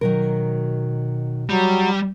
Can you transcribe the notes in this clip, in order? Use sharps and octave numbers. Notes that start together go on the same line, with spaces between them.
B2 D#3 F#3 A#4
F#3 G3